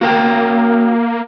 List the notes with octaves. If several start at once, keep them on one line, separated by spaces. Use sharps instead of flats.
A#3 F#4 A#4 G5